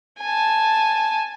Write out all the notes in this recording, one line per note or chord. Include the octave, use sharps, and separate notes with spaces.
G#5 A5